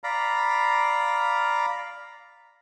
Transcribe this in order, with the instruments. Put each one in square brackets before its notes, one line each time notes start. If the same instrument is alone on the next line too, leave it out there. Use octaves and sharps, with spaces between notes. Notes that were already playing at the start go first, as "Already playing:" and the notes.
[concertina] D5 F5 A#5 B5